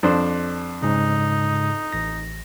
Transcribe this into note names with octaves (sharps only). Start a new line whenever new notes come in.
F2 D4 C5
G#2 C#3 D#4
A1 A#6